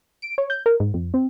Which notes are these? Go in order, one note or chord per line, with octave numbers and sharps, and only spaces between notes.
D7
C#5
G6
A#4
G#2
F2
C4